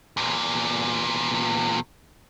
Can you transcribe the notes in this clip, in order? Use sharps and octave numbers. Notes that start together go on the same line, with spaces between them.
E2 A#2